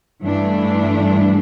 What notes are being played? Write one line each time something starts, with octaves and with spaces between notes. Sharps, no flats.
G2 E3 A3 D4